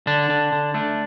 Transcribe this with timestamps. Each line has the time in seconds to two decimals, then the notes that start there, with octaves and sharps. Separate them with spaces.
0.07 D3 D4
0.30 D3
0.52 D3
0.74 A3 D4